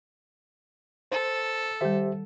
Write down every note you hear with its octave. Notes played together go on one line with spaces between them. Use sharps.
A4 C5
D#3 G3 G4 C5 E5